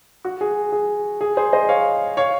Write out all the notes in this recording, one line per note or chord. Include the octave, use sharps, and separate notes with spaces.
F#4
G#4
G#4
G#4
G#4 C5
C5 D#5
C#5 F5
C#5 F5